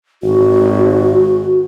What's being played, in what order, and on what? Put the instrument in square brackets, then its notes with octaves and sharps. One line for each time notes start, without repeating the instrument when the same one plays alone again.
[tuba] G#1 [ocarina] F#4